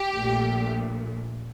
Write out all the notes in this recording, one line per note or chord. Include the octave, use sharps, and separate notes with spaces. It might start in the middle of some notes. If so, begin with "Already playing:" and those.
Already playing: G4
A#1 A#2 A3